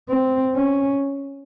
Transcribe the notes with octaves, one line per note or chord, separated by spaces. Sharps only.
C4
C#4